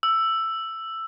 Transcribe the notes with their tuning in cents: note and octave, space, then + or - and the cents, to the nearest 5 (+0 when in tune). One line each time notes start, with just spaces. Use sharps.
E6 +10